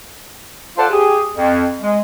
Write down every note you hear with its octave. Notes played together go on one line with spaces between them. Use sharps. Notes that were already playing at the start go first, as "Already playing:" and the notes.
F4 A4 C5 D5 F#5 A5
G4 G#4
F2
G#3